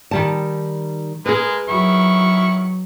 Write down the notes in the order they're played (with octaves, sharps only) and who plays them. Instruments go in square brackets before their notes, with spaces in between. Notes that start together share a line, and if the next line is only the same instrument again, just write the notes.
[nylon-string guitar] D#3 G3 A5
[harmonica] G#3 A#4 [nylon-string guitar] G#4 B4
[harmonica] D#3 E4 C#6 [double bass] F#3